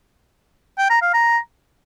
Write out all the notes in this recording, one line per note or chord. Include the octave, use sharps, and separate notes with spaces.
G5
A#5
F5
A#5